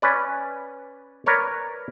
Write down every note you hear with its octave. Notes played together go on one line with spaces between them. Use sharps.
C#4 B4 D5
A#4 B4 C#5 D5